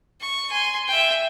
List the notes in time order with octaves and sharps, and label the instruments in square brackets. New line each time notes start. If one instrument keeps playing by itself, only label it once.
[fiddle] C#6
G#5 C6
E5 G5